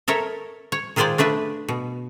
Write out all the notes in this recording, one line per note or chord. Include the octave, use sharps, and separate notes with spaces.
A4 A#4 C#5 E5
C#5
D#3 G#3 F4 C5 D5 G#5
A3 D4 B4 E5
B2